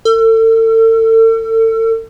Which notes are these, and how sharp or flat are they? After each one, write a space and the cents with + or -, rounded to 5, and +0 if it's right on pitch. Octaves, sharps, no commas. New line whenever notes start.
A4 +40